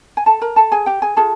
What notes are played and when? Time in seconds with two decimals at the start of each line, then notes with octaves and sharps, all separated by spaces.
0.17 G#5
0.26 A4 A5
0.42 A#4 A#5
0.56 A4 A5
0.72 G#4 G#5
0.86 G4 G5
1.02 G#4 G#5
1.17 F4 G#4 A4 A5